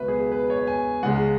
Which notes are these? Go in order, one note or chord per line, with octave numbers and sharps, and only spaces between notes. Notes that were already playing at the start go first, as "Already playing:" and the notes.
Already playing: C#2 B2 F#3 B4 E5
G#4
B4
C#5
G#5
C#2 C#3 G#3 F#5